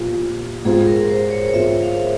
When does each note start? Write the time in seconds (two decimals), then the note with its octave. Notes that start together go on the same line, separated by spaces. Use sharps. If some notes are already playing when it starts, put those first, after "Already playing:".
Already playing: A#2 F3 A#3 G4
0.65 G#2 F3 G#3 C4 F4 G#4
0.87 A#4
1.09 C5
1.31 C#5
1.48 C#5
1.54 G#2 F3 G#3 C4 F4 E5
1.82 F5